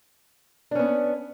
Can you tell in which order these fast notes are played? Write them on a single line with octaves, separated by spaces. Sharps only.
D4 C#4 B3